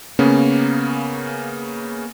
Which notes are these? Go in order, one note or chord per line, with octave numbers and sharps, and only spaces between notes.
C#3 A#3 B3 C#4